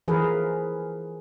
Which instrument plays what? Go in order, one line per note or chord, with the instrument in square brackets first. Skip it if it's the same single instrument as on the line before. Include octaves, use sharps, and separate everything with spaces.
[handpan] E3 F3 G#4 A#4 B4